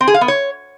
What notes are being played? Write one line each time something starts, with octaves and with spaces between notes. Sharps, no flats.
C4
G#4
F5
B3
C#5